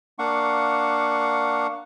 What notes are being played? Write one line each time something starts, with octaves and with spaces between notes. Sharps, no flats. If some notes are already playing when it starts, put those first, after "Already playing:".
A#3 D4 F5 F#5 C#6